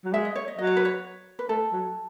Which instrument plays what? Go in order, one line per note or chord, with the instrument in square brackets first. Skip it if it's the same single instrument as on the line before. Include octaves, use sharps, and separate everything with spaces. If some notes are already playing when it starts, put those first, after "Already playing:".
[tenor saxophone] F#3
[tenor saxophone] G#3 [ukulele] E5
[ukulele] D#5
C#5
D#5
[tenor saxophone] F#3 [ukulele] D#5
[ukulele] C#5
B4
C#5
B4
[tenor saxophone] A3 [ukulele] A4
[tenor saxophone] F#3